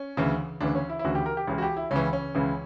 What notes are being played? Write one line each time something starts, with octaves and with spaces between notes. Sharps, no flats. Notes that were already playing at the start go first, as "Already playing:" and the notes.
Already playing: C#4
D2 C#3 E3
D2 C#3 E3 D4
C#4
E4
E4
D2 C#3 E3 F#4
G4
A#4
G4
C#2 C#3 E3
F#4
G4
E4
C#2 C#3 E3 C#4
C#4
C#2 C#3 E3